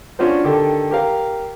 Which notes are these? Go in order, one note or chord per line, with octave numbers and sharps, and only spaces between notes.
C#4 D4 F4 F#4 C5
D3 D#3 G4 A4
G4 A#4 F5